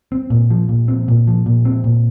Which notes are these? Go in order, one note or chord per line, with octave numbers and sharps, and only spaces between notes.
C4
A#2
F3
A#2
C4
A#2
F3
A#2
C4
A#2